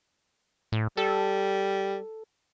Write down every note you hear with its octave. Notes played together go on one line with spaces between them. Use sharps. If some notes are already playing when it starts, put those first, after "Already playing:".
A2
G3 A4